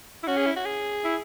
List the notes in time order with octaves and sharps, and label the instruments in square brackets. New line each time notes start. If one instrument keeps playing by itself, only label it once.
[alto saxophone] E4
[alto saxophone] C#4 [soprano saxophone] F#4
[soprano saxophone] G#4
E4
F#4
G#4
[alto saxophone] E4